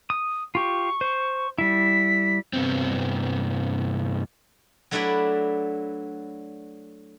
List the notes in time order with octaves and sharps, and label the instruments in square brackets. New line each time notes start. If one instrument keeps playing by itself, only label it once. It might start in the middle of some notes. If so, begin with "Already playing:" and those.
[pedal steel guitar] D#6
[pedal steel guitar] F4 G4 [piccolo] C#6
[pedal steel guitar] C5
[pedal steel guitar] G3 E4 [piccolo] B6
[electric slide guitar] G2 C3 B3 C4
[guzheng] F#3 A3 D4 E4 B4 D5